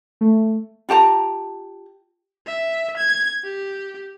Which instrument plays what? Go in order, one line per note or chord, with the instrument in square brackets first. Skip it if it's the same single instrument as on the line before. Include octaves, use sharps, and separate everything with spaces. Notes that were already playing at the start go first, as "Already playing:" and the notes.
[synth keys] A3
[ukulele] F4 G4 A5 A#5
[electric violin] E5
G#6
G4